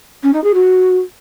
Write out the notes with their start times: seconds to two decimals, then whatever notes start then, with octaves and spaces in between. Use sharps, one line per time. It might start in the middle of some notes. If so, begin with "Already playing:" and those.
0.23 C#4
0.34 D#4
0.44 G#4
0.54 F#4